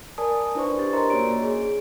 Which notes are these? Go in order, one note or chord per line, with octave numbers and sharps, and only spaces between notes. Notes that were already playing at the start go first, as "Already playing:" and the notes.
A#4 D5 G#5 A5 D#6
D4 E4 B4 C5 D5 C#6
D4 G4 A6
A#4 C5 D#5 A#5 C6
A#3 C#4 F#4 C#5 D5 D7
G#4